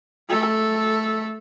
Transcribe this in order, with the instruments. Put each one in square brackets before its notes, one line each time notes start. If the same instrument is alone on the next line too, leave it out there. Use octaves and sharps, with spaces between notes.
[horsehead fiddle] A3 A4